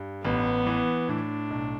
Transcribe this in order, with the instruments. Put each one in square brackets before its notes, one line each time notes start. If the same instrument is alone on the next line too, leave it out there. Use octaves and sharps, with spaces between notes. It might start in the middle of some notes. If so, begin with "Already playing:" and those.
Already playing: [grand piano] G2
[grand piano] A1 [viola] B3
[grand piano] E3
[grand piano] A2 [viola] D4
[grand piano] B1